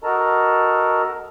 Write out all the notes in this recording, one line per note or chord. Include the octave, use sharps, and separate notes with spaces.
F#4 A4 A#4 D#5 A5 A#5